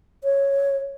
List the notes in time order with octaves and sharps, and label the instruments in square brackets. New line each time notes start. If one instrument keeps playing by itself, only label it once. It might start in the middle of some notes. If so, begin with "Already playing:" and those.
[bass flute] C#5